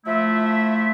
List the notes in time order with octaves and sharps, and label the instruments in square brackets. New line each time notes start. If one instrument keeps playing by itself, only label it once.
[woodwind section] F3 A3 E4 E5